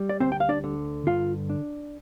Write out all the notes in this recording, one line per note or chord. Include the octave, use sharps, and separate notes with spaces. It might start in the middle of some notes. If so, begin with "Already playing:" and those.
Already playing: G3
D5
D2 C4 C5
G5
F5
D4 D5
D3
G2 F4 F5
D4